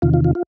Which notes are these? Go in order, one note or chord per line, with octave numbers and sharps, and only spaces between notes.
E2 C3 D#3 F4
F4
F4
F4